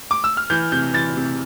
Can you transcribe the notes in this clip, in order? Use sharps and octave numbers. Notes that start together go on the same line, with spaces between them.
D6
E6
F6
E3 G6
C3 G6
E3 A6
C3